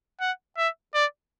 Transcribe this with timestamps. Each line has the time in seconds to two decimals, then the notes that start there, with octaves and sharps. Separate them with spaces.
0.20 F#5
0.57 E5
0.94 D5